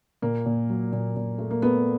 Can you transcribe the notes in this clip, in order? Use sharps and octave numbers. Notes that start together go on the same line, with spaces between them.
A#2 A#3
A#2
F#3
A#2
A#2
A3
A#3
A3 B3